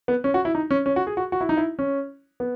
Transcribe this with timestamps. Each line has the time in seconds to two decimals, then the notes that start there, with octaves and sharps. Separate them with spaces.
0.08 B3
0.24 C#4
0.34 F#4
0.45 E4
0.55 D#4
0.71 C#4
0.86 C#4
0.96 F#4
1.07 G#4
1.17 F#4
1.32 F#4
1.41 E4
1.49 D#4
1.57 E4
1.79 C#4
2.40 B3